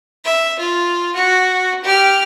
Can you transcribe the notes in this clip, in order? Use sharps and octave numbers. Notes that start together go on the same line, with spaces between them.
E5
F4
F#4
G4 F6